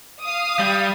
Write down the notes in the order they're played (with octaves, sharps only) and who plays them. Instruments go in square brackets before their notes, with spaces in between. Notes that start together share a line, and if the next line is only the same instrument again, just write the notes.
[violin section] F5 D#6
[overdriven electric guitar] G3